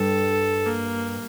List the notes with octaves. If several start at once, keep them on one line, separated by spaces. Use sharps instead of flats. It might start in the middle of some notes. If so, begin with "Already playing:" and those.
Already playing: G2 A4
A#3